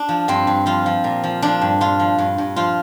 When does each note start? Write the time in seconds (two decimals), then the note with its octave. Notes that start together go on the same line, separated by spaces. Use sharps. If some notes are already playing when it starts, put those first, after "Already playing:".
Already playing: D4
0.09 F3
0.28 G2 C4
0.47 G2
0.66 F3 F4
0.86 F3
1.04 A#2
1.23 F3
1.42 F3 D4
1.61 G2
1.80 G2 F4
1.99 F3
2.18 G2
2.38 G2
2.56 F3 F4